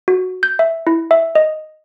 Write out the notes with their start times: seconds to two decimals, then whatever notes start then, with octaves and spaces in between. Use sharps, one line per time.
0.08 F#4
0.43 G6
0.59 E5
0.87 E4
1.11 E5
1.35 D#5